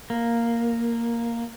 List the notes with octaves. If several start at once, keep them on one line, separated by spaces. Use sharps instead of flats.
A#3